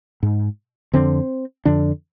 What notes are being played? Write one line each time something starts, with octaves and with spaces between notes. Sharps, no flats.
G#2
F2 D3 C4
F2 D3 D4